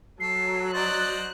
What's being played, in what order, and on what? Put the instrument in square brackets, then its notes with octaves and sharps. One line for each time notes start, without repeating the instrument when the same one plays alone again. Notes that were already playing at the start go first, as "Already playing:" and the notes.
[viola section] F#3 [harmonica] A4 [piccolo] C7
[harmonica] C5 D5 D#5 [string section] F#6 [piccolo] A6